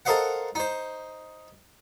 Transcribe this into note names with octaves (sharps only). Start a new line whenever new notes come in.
A4 A#4 C5 D#5 F5 F#5
D#4 C5